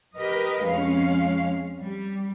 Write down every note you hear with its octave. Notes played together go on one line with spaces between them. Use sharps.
G4 A#4 B4 D#5
F2 G#3 C#4 F5
G3